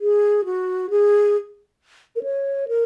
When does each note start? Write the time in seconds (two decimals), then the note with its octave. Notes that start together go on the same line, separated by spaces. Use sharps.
0.01 G#4
0.45 F#4
0.90 G#4
2.16 A#4
2.23 C#5
2.68 A#4